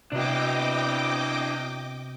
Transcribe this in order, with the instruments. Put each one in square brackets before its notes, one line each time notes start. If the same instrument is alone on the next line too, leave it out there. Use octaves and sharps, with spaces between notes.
[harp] C3 B3 F#4 [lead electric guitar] D4 E4 [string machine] D#5 G5 D6